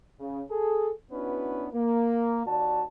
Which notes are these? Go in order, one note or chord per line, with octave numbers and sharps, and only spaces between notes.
C#3
G#4 A4
B3 C#4 D4 E4 F#4 B4
A#3
D#2 F#4 D5 A5